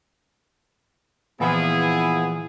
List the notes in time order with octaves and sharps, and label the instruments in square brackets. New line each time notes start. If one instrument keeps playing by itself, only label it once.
[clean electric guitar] A#2 E3 F3 [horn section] B3 E4 G#4